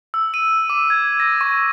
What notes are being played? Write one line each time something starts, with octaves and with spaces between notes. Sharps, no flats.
E6
D#7
D6
G#6
A#6
C#6